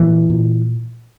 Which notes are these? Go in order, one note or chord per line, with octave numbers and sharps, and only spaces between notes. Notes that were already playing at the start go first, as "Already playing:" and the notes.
Already playing: A#2 E3
A#2